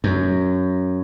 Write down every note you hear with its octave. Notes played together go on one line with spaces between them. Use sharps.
F#2